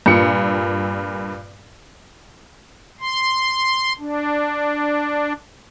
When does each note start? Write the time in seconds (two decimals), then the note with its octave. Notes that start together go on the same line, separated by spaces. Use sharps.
0.06 G2 A#2 C#7
3.00 C6
3.99 D4